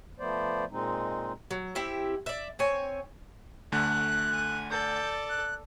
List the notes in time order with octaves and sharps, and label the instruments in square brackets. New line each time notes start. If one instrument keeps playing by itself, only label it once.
[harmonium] F3 A3 B3 C5 D5
A#2 G#3 C4 D#4
[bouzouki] F#3
C4 E4 G4 E5
D5 E5
C4 C#5 G#5
[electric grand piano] D2 D3 A3 [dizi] F#6
[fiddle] G#5
[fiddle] A4 D5 [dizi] G6
[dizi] F#6